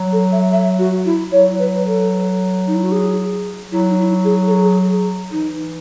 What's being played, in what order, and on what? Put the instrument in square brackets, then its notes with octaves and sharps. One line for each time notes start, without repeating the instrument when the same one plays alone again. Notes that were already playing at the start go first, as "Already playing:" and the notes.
Already playing: [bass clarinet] F#3
[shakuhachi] A4
E5
E5
F#4
E4
[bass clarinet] F#3 [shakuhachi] C#5
[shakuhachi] B4
A4
D#4
E4
F#4
G#4
[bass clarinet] F#3 [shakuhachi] E4
[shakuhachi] D#4
E4
G#4
A4
G#4
[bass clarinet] E3 [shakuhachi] D#4